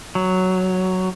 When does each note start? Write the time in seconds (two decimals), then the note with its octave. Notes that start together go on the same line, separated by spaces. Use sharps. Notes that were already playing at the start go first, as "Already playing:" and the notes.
0.15 F#3